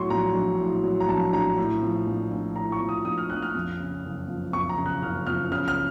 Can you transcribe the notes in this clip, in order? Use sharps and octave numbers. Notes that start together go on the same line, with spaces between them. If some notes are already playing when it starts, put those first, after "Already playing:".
Already playing: A2 F#3 C6 C#6
A#1 A#5
A#1
A2
F#3
A#5
A#1 A5
A#1 A#5
A2
F3
A#1
A#1
A2 A#5
C#6
F3
D#6
A#1 D#6
F6
A#1 F#6
F6
F2
C#3
F#1
F3
F2 C#6
A#5
C#3
F#6
F#1 F6
F3 F6
C#3 F6
F6